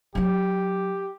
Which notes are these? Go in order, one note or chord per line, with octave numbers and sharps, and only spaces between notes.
F#3 D#4 G4